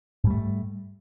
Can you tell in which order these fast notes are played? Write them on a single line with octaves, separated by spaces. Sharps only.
G#2 G3 A3